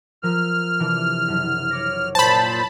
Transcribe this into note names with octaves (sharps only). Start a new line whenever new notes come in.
F3 A#4 E6 F6
C3 E3 D4
F#1
C#5 D6 A#6
A#2 C5 A5 B5